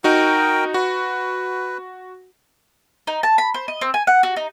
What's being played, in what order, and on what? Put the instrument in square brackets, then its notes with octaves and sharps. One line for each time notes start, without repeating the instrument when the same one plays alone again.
[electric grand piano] D#4 F#4 [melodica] A#4 G5
[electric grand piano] F#4 [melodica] B4
[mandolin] D#4
A5
B5
C5
D#5
C4
G#5
F#5
F#4
D#4